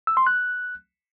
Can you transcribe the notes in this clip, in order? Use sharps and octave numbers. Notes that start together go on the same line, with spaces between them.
E6
C6
F#6